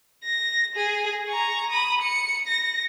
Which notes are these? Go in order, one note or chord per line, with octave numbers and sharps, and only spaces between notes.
A#6
G#4
A#5 C#6
B5 D#6
C#7
A#6